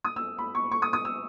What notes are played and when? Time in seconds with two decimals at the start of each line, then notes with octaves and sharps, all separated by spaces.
0.04 D#6
0.16 E6
0.38 B5
0.55 C#6
0.72 C#6
0.82 D#6
0.93 D#6
1.05 E6